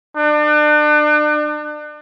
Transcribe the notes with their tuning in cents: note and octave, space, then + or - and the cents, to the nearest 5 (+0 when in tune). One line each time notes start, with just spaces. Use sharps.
D4 +35